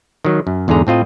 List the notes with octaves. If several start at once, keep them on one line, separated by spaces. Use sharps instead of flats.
D#3 F#3
F#2
E2 G#2 D3 G#4 A#5
A2 C4 F4 D#5